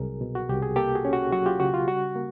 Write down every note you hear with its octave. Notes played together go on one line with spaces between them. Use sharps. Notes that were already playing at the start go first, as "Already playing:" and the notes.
Already playing: C2 F#3 G#4 A#4
B2
F#4
C2 G4
G#4
A#3 G4 A4
F#4 G#4
C#4
F#4
F#3 F#4
F4 G4
C#3 F#4
F4
G3 F#4
A#3